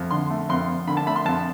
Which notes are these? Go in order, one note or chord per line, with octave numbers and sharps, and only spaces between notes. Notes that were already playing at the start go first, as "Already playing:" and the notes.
Already playing: F2
D3 C6
A3
F2 C6
F2
D3 B5
A5
A3 B5
C6
F2 A5